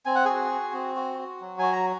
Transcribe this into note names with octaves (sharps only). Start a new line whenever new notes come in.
C4 G#5
F#5
F#4 G#4 G#5
F#4
C4
F#4
F#4
F#3
F#4 G#5
A#5